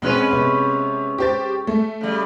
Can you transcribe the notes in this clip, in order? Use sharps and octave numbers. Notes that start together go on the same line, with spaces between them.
B2 G#3 C4 C#4 B4
C3 B3
G4 C5 A6
A3
C#3 G3